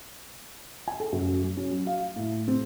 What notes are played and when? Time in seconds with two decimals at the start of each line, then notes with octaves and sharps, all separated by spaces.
0.88 G#5
1.00 A4
1.12 F#2
1.42 F#3
1.57 C#4
1.71 F#3
1.87 F5
2.16 A2
2.48 C4